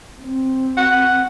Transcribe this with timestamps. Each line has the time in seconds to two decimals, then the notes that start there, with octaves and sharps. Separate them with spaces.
0.22 C4
0.77 F#5